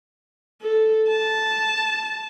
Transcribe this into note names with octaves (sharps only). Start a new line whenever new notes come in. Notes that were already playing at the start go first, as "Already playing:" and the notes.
A4
A5